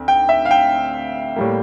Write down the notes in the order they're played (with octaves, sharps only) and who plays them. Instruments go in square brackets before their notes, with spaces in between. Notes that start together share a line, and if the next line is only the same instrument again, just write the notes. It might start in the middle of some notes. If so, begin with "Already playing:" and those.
Already playing: [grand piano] D2 C4
G5
E5
F5
G5
A2 G3 A#3